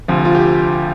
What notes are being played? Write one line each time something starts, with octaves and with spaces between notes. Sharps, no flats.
D2 C3 F3 F4
F4
G4